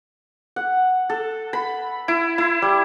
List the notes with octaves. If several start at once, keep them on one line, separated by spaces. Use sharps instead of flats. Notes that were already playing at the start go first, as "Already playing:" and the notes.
F#5
A4
B5
E4
E4
G3